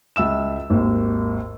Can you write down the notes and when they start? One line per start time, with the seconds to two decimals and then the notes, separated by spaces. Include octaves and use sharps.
0.16 C#2 E5 E6 E7
0.70 G#1 D#2